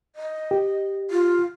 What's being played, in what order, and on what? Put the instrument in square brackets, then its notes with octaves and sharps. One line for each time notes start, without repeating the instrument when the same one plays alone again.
[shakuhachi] D#5
[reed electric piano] G4
[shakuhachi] F4